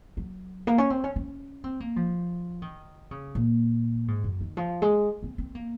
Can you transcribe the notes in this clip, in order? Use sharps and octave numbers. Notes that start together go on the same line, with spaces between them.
F#3
A#3
C#4
C4
C#4
C#4
C4
A#3
F3
D#3
C#3
A#2
G#2
F#2
D#3
F3
G#3
C4
C4
A#3